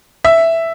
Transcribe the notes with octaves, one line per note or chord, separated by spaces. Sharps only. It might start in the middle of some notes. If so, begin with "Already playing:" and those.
E5